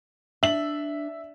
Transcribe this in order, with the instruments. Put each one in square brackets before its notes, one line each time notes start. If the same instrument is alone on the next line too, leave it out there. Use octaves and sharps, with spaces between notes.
[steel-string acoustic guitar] D4 [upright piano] E5 F#7